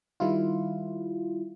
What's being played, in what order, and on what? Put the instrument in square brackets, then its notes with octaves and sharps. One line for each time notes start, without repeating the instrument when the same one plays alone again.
[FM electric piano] D#3 G3 E4 F4